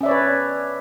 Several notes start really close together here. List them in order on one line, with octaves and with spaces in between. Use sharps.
C#4 E5 D5 C#5 B4